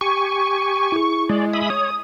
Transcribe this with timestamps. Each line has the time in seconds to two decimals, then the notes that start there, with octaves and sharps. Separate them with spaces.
0.01 G4 G#5 C#6
0.92 E4 G#4
1.29 G#3 D5
1.53 E5 B5 D#6
1.70 C#5 D#6